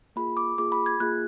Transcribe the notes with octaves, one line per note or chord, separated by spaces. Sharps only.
A#3 F4 G#4 B5
D6
A#3 F4 G#4 D6
B5
G#6
A#3 F4 G#4 F#6